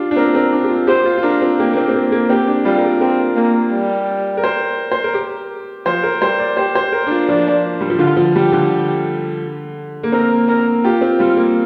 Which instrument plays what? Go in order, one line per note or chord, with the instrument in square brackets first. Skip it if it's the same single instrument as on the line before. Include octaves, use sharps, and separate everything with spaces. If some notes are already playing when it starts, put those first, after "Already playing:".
Already playing: [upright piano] D4 F4 G4
D4
[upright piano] C4 [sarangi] A#4
[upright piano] C4
D4
G4
F4
[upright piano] G4 [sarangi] C5
[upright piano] F4
F4
[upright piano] D4 [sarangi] A#4
[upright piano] C4
[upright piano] A#3 [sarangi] G4
[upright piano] A#3
C4
C4
A#3
A#3
[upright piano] C4 [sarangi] G4
[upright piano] D4
[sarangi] G3 [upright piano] F4
[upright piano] A#4
G4
[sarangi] C4 [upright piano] A#4
[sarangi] A#3
G3
[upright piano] A#4
C5
C5
A#4
G4
[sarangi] F3 [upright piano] C5
[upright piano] A#4
[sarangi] G3 [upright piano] C5
[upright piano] D5
[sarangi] G4 [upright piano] C5
[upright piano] C5
A#4
D4
F4
[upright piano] F3 [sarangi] D4
[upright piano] G3
F3
[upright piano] D3 [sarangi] F4
[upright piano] F3
[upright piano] G3 [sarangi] G4
[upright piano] D3
A#3
[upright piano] C4 [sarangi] A#4
[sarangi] A#4
[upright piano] F4 [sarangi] G4
[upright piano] C4
[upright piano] G3 [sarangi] F4
[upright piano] A#3